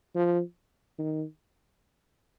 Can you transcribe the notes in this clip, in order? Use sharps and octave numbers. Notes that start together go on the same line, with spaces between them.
F3
D#3